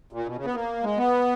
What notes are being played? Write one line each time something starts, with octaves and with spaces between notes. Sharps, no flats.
A#2
B2
C#3
B3
A#3
G#3
B3